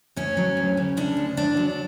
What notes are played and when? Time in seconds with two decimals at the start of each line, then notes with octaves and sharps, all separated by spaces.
0.16 D2 C#4
0.37 F#3
0.57 D2
0.77 C#3
0.97 C#3 D4
1.17 D2
1.37 D2 D4
1.57 F#3